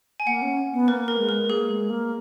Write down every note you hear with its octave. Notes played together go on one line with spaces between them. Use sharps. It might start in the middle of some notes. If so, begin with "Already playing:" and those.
G#5
A#3 F#5
C#4
B3
A#3 B4
A#4
G#3
A#4
A#3 G#4
G#3
A#3